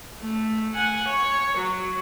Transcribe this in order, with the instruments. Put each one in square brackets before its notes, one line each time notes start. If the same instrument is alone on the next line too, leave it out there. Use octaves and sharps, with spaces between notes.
[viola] A3
F#5 G#5
C#5
F#3